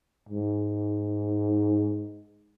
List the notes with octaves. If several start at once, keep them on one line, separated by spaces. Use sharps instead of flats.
G#2